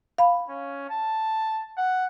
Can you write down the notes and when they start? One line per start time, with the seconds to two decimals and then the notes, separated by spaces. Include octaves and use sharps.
0.18 F5 B5
0.49 C#4
0.90 A5
1.77 F#5